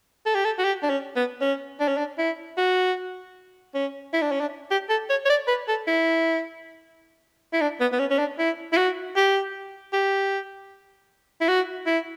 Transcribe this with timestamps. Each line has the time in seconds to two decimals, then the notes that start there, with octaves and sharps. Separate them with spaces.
0.26 A4
0.35 G4
0.45 A4
0.59 F#4
0.64 G4
0.83 D4
0.90 C#4
1.16 B3
1.41 C#4
1.80 D4
1.88 C#4
1.97 D4
2.18 E4
2.57 F#4
3.74 C#4
4.13 E4
4.22 D4
4.31 C#4
4.41 D4
4.71 G4
4.90 A4
5.10 C#5
5.25 C#5
5.29 D5
5.48 B4
5.68 A4
5.87 E4
7.53 E4
7.61 D4
7.80 B3
7.92 B3
7.99 C#4
8.10 C#4
8.19 D4
8.39 E4
8.73 E4
8.77 F#4
9.16 G4
9.93 G4
11.41 E4
11.48 F#4
11.86 E4